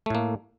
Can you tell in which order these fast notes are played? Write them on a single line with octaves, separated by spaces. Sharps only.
A3 A2 A#3